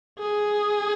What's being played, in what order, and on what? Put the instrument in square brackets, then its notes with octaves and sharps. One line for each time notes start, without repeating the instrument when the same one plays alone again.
[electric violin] G#4